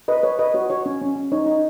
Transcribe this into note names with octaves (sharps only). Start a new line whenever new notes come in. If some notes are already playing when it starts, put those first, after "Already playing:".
B4 D#5
B4 C#5
B4 D#5
F#4 C#5
F#4 C#5
C#4
C#4
C#4
D#4 C#5
D#4